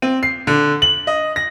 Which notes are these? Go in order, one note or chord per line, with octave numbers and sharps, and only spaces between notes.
C4
C7
D3
F#7
D#5
A#6